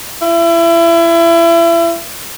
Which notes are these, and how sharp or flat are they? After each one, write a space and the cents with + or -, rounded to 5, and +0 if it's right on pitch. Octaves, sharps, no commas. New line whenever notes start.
E4 +30